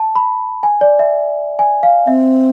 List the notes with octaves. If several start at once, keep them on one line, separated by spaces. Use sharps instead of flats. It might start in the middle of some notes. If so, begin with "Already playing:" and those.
Already playing: A5
B5
G#5
D5
E5
G#5
F5
C4 E5